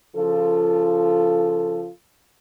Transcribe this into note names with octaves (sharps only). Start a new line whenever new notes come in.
C#3 F3 F4 A4